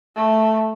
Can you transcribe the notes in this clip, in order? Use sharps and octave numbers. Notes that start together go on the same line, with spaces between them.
A3